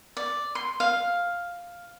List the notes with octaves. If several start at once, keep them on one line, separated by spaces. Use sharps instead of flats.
D5
C6
F5